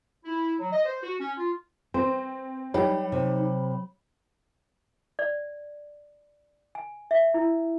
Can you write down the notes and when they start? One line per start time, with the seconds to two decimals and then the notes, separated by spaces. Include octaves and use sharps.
0.25 E4
0.60 F#3
0.72 D#5
0.85 C5
1.03 F#4
1.20 C#4
1.38 F4
1.94 C4 C5
2.74 F#3 G3 D#4 C#5 G5 B5
3.12 C3
5.19 D5
6.75 G#5
7.11 E5
7.34 E4